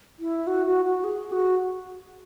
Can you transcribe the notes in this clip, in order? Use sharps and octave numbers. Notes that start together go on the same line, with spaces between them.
E4
F#4
F#4
F#4
G#4
F#4